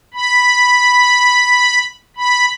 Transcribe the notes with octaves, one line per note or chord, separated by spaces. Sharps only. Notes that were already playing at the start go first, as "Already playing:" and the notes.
B5
B5